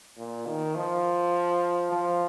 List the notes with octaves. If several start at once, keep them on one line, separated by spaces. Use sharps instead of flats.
A#2
D#3
F3
F3